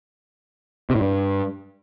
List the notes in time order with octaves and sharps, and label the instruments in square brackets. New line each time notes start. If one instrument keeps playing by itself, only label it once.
[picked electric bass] C3
A2
G2